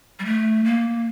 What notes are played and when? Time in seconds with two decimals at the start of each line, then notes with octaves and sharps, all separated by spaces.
0.19 G3
0.25 A3
0.65 A#3